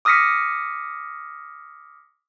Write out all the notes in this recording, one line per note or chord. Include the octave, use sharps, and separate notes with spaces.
D6 D#6 F6 A#6 B6 C#7